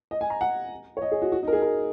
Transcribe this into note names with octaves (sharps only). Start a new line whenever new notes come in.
D#5
G#5
A#5
F#5
C#5
D#5
G#4
F#4
F#4
D#4
A#4
G#4
A#4